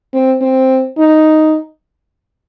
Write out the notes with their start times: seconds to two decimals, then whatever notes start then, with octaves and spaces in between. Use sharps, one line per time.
0.13 C4
0.41 C4
0.98 D#4